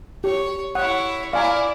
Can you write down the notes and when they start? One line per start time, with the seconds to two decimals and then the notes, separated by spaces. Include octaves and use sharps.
0.24 G4 C#5
0.75 E4 C#5 F#5
1.33 E4 D5 F5 G#5 A#5